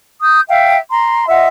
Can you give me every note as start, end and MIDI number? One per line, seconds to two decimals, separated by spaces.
0.22 0.41 87
0.22 0.41 91
0.48 0.77 76
0.48 0.77 77
0.48 0.77 79
0.90 1.24 82
0.90 1.24 84
1.28 1.48 65
1.28 1.48 75
1.28 1.48 76
1.28 1.48 78